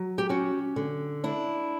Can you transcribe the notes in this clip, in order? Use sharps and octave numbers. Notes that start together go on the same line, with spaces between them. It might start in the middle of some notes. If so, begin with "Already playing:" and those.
Already playing: F#3
G4
C#4 F#4
D3
D4 E4